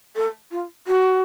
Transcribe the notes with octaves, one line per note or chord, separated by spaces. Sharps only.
A4
F4
F#4